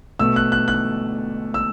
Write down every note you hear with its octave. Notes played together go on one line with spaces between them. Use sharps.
B2 A3 E6
F#6
F#6
F#6
E6